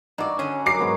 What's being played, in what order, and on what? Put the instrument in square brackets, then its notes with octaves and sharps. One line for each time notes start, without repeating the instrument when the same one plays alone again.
[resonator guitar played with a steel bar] G2 D5 [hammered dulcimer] D#4 F#4
[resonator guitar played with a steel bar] D3 G#5 [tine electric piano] C#4
[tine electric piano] F#3 [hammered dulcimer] A#4 [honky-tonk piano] D6 C7
[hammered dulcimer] G#2 B3 C#5